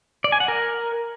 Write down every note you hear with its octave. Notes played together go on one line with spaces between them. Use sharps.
D5
G#5
F#5
A#4